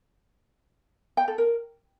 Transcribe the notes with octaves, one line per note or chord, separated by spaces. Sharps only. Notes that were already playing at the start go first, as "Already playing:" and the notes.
G5
A4
A#4